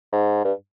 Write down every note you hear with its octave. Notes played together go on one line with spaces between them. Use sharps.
G#2
G2